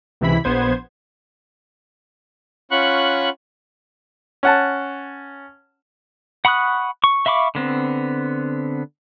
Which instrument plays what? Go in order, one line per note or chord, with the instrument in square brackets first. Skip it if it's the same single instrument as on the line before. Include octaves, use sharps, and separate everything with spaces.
[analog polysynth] C#2 C3 E3 E4 B5 B6
A#1 B3 C5 G#6
[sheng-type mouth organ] C#4 F4 F#5 B5 C#6 F#6
[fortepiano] C#4 F#5 A5
[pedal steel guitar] F#5 B5 C#6 D#6 F#6
C#6
E5 F5 B5 C#6 D6
D3 B3 C4